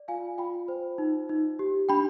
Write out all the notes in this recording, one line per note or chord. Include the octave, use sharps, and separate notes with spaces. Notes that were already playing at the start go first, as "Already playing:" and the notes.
Already playing: D5
F4 F5 G#5
F4 G5 B5
C5
D#4
D#4
G4
D4 G5 B5